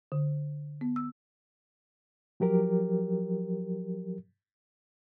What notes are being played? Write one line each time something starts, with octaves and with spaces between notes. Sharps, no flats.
D3
B3
E6
F3 F#3 G4 A#4